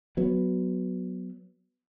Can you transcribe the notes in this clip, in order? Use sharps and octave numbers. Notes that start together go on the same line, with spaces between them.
F#3 B3